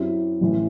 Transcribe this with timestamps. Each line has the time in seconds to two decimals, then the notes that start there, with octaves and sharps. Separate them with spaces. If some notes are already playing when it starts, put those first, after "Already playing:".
Already playing: F#2 F#3 C4 E4 G4
0.41 A1 A2 E3